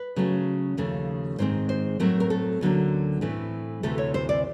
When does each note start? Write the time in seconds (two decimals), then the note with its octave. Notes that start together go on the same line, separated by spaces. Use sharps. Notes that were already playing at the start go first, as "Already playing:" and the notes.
Already playing: B4
0.16 C#3 F#3 A3 C#4
0.77 D#2 C#3 F3 A3
1.39 G#2 D#3 G#3 C4 C5
1.69 C5
2.00 A2 F#3 A3 C4 A#4
2.20 A#4
2.30 A4
2.61 D2 D3 F#3 A#3 C#4
3.21 A2 E3 A3 C4
3.83 D2 C3 E3 A3 A4
3.98 C#5
4.14 C5
4.29 D5